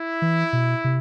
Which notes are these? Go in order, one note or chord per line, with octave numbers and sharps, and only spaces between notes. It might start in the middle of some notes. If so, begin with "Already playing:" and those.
Already playing: E4
E3
B2
C3